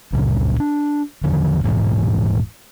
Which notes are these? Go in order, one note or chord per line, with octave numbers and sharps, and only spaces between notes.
C#2 G2 A#2 C#3
D4
E2 D3 D#3 F3
D#1 G#2 B2 E3